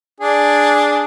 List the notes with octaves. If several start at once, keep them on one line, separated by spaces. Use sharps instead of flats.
D4 G#4